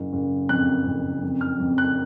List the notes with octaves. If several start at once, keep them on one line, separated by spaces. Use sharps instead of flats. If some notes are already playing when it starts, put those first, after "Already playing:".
Already playing: F#1
F#1
F2 F#6
F#1
F2
F6
F2
F#6